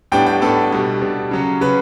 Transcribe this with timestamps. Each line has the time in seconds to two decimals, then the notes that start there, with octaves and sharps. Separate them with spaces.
0.12 A2 G3 B3 D4 G5
0.27 G5
0.41 A2 G3 B3 D4 A4
0.72 B2 G3 D4
1.01 B2 G3 D4
1.31 C#3 F#3 C#4
1.61 C#3 F#3 C#4 B4